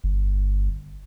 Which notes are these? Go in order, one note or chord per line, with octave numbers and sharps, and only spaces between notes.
G1